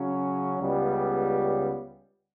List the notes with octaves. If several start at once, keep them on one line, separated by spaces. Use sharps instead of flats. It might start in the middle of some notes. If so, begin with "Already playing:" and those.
Already playing: C#3 F#3 C#4
C#2 C#3 G3 B3